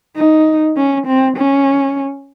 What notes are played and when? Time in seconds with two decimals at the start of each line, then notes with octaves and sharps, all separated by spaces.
0.16 D#4
0.77 C#4
1.07 C4
1.37 C#4